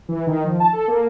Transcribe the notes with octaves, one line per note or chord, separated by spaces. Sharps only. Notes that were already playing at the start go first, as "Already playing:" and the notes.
E3
D#3
F3
A5
A4
A#3